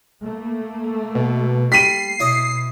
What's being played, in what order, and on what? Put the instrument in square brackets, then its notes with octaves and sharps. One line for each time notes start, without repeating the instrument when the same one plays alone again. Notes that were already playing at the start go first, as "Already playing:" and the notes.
[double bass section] A3 A#3
[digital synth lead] B2
[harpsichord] G3 B5 C6 [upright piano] B6 D#7 [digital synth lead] C7
[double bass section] B2 [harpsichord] E4 C#5 D#5